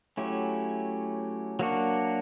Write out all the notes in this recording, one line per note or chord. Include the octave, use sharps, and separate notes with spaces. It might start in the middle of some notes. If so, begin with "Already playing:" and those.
F#3 A3 C#4 E4 G4
F#3 A#3 D4 F#4